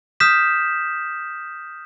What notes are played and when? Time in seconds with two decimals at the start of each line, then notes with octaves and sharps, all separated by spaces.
0.20 D#6 F6 G6 B6 E7